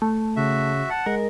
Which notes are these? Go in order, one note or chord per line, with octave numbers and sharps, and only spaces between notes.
A3
C#3 F#4 E5
F#5 A5
G#3 A#4